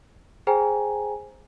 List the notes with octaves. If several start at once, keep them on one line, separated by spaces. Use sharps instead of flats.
G#4 C5 G5 G#5 A#5